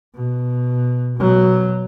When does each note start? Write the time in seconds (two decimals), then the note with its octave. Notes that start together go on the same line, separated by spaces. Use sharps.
0.15 B2
1.18 B2 F#3